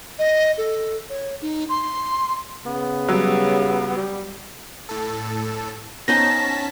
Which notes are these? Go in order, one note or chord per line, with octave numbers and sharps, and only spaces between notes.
D#5
A4
C#5
D#4
C6
C#3 B3
F#3 G3
G3
A2 A4
B3 C#4 D#4 C5 A5 A#6 B6